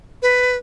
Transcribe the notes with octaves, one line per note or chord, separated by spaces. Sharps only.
B4